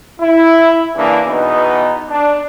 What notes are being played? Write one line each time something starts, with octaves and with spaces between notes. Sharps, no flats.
E4
C#3 E3 A#3 D4
E2 B2 B3 D#4
D4